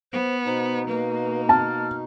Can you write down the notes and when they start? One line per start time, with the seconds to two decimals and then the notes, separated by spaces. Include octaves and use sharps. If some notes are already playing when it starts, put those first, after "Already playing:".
0.12 B3 C5
0.46 B2 D#4 C5
0.88 A#3 B4
1.49 A5 F6